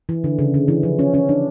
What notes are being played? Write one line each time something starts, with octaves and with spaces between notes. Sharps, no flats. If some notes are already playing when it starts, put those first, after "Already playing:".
E3
D3
C#3
D3
E3
F3
C#4
C#4
D4